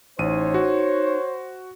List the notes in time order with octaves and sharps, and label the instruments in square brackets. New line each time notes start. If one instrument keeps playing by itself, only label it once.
[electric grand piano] A1 D#7 [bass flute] D#4 [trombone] C5 [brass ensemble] C#5
[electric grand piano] F#4